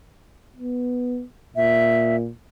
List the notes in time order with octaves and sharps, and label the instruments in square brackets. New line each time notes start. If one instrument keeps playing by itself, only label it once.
[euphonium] B3
[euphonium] A#2 [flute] E5